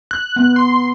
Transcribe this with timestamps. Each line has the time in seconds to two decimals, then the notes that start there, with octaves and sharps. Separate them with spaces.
0.11 F#6
0.36 B3
0.56 C6